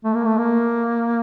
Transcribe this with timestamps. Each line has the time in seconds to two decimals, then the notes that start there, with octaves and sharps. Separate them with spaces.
0.04 A3
0.14 A#3
0.26 A3
0.38 A#3